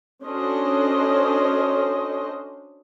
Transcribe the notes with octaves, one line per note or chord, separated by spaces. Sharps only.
C#4 D4 F#4 A4 C5 D#5